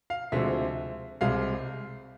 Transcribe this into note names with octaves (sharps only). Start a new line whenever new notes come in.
F5
D2 C3 F3 G#3 E5
C2 C3 G#3 F5